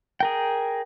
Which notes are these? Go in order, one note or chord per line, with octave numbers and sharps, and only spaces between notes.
G#4 A#4 G5